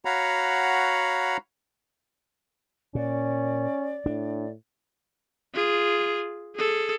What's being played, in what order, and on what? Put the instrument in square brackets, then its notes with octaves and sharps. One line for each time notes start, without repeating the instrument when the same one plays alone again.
[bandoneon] F#4 C#5 F5 F#5 A#5 B5
[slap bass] A#2 [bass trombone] C#4 [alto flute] D5
[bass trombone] A2 [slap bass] D4
[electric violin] F4 G#4
G#4 A4